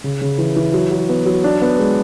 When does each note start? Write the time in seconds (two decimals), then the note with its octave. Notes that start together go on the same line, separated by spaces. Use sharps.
0.04 C#3
0.21 C#3
0.38 E3
0.56 E3
0.73 F#3
0.91 F#3
1.09 B3
1.26 F#3
1.44 D4
1.62 B3
1.79 G#3